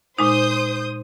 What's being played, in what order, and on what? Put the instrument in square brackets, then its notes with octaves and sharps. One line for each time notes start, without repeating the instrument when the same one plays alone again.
[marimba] A#2 G#3 D#4 [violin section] C5 D#6 G6